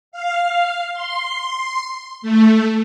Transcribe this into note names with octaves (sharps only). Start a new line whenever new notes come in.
F5
C6
A3